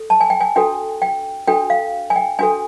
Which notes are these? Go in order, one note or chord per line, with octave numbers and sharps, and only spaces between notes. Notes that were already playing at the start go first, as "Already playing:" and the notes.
Already playing: A4
A5
G#5
G5
G#5
D4 F#4 A4 G5
G5
D4 F#4 A4 G5
F5
G#5
G5
D4 F#4 A4 G#5